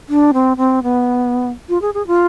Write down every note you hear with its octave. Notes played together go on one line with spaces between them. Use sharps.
D4
C4
C4
B3
F4
G#4
G#4
F4